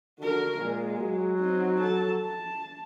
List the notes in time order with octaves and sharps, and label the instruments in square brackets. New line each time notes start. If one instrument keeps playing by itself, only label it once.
[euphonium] D3 [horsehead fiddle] F#4 A#4
[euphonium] A#2 [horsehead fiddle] G#3
[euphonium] F#3
[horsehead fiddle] C4 D#4
A4 A5
A5